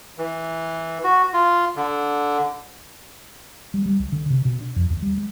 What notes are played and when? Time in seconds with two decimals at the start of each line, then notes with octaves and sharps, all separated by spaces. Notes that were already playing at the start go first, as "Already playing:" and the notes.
0.18 E3
1.04 F#4
1.34 F4
1.76 D3
3.74 G3
3.86 G3
3.99 C#2
4.12 D3
4.30 C3
4.45 B2
4.61 D4
4.76 F2
4.90 D#2
5.02 G3
5.18 G#3